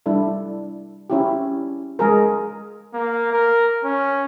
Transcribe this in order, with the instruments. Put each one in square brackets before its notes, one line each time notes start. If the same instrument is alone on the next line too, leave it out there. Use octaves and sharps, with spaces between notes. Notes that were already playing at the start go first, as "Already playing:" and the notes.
[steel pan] G3 D4 E4 A4
C#4 E4 G4
G#3 G#4 A#4
[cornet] A#3
A#4
C#4